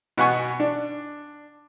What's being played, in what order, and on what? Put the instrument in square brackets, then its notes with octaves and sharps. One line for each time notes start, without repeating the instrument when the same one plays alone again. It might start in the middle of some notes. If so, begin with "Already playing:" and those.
[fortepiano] B2 B3 F#5 G#5 C#6
D4